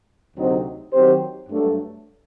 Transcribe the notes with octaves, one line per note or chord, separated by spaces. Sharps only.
D2 C3 F#3 C4 D#4
D#3 F#3 C4 G4 C5
G2 F#3 A3 D4 A4